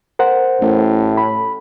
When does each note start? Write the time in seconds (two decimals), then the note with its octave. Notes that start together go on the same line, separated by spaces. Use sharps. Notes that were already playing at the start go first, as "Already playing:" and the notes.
0.19 A#4 C5 F#5
0.61 A1 A2
1.17 B5